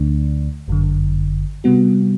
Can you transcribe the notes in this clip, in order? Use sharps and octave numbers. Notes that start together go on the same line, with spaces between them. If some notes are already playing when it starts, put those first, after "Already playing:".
Already playing: D2 D3 A3 D4
G1 F#2 D3
C3 G3 B3 F#4